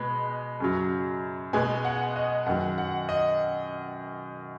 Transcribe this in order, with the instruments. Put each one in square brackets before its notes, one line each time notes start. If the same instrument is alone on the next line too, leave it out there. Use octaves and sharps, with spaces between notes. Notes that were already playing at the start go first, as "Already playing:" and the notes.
Already playing: [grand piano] B2 G#3 B5
F#2 C#3 F#3
B2 G#3 G#5
F#5
D#5
F#2 D#3 F#3 F#5
F#5
D#5